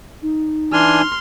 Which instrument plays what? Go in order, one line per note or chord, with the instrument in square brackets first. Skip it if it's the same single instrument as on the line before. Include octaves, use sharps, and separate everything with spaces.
[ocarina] D#4
[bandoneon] E3 D4 G#5 [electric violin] C6 F6